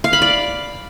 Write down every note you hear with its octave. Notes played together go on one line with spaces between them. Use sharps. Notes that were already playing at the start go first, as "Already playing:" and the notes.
F5
B5
D5